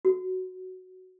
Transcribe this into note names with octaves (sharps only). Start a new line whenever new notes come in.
F#4